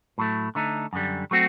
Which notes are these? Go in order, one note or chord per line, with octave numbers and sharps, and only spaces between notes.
A2 F#3 A3
D3 A3 D#4
F#2 D3 G3
F#3 A3 C4 F#4